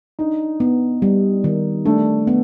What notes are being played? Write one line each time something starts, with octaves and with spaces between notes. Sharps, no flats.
D4 D#4
B3
G3
D#3
A3 D4
B3